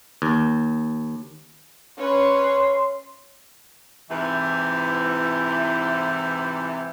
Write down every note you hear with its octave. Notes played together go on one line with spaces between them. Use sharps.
D#2
C#4 B4 C#5 C6
G#2 C3 E3